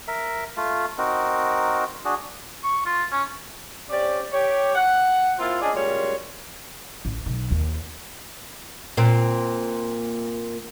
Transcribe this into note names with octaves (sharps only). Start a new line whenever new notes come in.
A#4 E5
A3 F4
C4 D#4 F#4 A#4
D4 F#4 G#4
C#6
F4
C#4
C4 C#4 G4 D5
G4 C#5
F#5
A#3 C4 E4 F4
C#4 D4 G#4 D5 D#5
F#2 A#2 G3 G#3 F4 C#5
A1
B1
D#2
A#2 C4